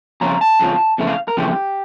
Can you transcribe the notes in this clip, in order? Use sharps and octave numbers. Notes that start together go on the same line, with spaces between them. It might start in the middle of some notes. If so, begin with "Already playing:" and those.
F2 C#3 F3 C#4 F4 A#5
A5
F2 C#3 F3 C#4 F4
F2 C#3 E3 A3
F5
A#4
F2 C#3 E3 A3 G4